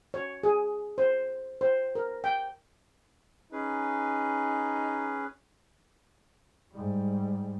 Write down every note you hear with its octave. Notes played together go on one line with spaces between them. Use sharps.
C#5
G#4
C5
C5
A#4
G5
C#4 D#4 G#4 B4
G#2 G3